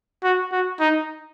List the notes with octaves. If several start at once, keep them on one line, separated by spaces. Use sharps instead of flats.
F#4
F#4
D#4